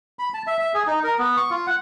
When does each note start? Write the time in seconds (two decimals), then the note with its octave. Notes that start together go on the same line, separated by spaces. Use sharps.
0.19 B5
0.34 A5
0.47 E5
0.59 E5
0.74 G#4
0.87 D#4
1.04 A#4
1.19 B3
1.37 C#6
1.51 F4
1.67 F#5